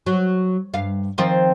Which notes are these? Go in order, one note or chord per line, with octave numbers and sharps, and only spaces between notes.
F#3
G2 F5
D#3 F3 C4